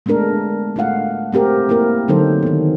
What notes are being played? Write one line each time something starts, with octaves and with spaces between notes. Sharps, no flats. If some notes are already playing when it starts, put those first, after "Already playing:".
G#3 A3 B3 D4 A#4
A3 D4 F4 F5 F#5
A3 C4 G4 A#4
A#3 E4 A#4
D3 F#3 C4 D#4 A4 C5
D#3 B3